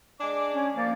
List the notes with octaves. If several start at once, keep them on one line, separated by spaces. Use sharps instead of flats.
G#3 D4 G#5 D6
C#4
F3 A#3 D5